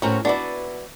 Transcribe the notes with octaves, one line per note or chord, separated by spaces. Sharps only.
A2 C4 C#4 F#4 A#4
B3 D4 E4 F#4 D5